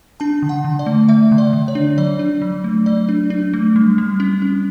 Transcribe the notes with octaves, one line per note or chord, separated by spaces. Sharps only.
D4 A5
D3
F#5
D3
D5
A3
A3 E5
D3
D5
D3
C#5
D4
F#3 D5
D4
F#3
A3
F#3 D5
D4
D4
A3
G3
G3
C#4
C#4